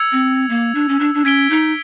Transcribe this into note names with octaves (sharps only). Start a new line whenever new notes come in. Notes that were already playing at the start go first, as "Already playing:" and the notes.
Already playing: E6 G#6 C#7 F7
C4
A#3
D4
C#4
D4
D4
C#4 G#6 B6 D7 G7
D#4